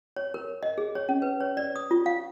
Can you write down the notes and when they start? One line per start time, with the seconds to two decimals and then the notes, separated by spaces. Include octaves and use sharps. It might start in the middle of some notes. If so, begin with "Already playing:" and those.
0.17 C#5
0.34 A#4
0.63 D#5
0.78 G#4
0.95 C#5
1.09 C#4
1.22 B4
1.41 C#5
1.57 D5
1.76 D#6
1.91 F4
2.06 F5